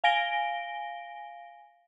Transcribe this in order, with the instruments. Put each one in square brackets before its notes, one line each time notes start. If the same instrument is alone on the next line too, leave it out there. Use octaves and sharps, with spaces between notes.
[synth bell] F5 G#5 A#6 D7 G7